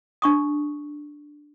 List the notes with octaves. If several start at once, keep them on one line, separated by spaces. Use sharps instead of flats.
D4 C#6 D#6